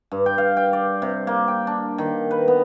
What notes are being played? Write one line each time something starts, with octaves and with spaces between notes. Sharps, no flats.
G2
G5
F5
G5
D5
C3
A#3
G5
D4
D#3
B4
B3